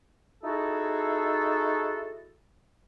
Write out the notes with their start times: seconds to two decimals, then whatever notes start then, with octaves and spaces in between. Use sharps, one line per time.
0.43 D#4 E4 F#4 G#4 A4